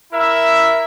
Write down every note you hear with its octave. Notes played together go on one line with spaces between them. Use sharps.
E4 A#4 E5